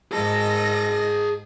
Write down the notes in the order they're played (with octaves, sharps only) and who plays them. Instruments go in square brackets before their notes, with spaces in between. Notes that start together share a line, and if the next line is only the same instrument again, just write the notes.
[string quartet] G#2 D#5 A#6 [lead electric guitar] G#4 A5